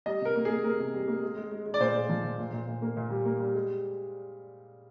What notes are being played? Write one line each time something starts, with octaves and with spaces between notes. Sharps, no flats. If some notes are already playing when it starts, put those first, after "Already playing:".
G3 D#5
C3 A#4
A#3
G#4
A#3
A#3 A#4
C3
G3
A#3
G#3
G#3
G#3
G#3
D5
A#2 C5
G#3
F3
A#2
A#2
A#2
A#2
A#3
A#2
G3
A#3
G3
G#3